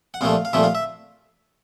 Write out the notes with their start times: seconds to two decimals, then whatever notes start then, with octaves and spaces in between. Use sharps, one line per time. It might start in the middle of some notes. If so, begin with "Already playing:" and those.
0.14 F#5
0.21 C2 A#2 F3 A3 F5
0.45 F5
0.53 C2 A#2 F3 A3 E5
0.63 F5
0.75 E5